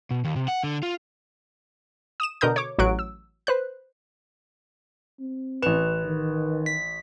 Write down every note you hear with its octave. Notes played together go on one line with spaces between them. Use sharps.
B2
D#2
C3
F#5
D3
F4
D#6 D#7 E7
B2 D3 A#4 A#5 D#6 G6
C#5 D6
A1 F#3 C#6 F#6 D7
E6
B4 C5 F#6
C4
A1 B4 E7
D#3
B6